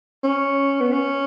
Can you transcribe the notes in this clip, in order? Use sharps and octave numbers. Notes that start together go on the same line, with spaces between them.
C#4
B3
C#4